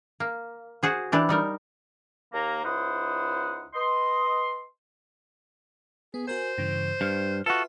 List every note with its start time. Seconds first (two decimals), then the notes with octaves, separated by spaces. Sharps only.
0.20 A#3
0.83 F#4 G#4 C5
1.12 E3 D4 G4
1.29 G3 D#4 A#4
2.34 D#2 A#3 A#5
2.65 C#2 D#4 E4 C5 F#5 D#6
3.74 B4 D#5 C6
6.14 B3 G#4
6.27 F#4 A#4 C5 G#5
6.58 G2 C#3 E3
7.01 G2 F6
7.46 F4 F#4 A4 B4 E5 F#5